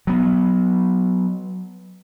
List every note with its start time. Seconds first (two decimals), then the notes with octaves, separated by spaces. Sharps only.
0.07 F#3 B3